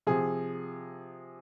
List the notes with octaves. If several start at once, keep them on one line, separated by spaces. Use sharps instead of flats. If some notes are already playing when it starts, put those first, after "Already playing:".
C3 F3 G#4